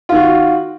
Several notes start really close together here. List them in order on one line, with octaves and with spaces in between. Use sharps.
F4 D#3 F#4